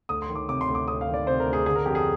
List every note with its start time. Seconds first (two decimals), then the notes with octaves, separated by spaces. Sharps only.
0.09 D2 D#6
0.22 C6
0.29 D#3
0.35 D6
0.49 C3 D6
0.61 C6
0.68 D2
0.75 D6
0.87 D2 D#6
1.01 F5
1.08 D#3
1.14 D5
1.26 C3 C5
1.40 A#4
1.46 D2
1.53 G#4
1.66 D3 G#4
1.76 A#4
1.86 F2 G4
1.95 G#4